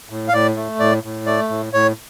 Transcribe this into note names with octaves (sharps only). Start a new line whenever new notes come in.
A2
F5
A2 D5
A3
A2 D5
A2
A3 D5
A2
A2 C#5